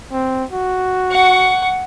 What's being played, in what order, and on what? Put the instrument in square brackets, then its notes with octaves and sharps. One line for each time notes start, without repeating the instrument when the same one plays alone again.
[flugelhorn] C4
F#4
[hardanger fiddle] F#5 C#6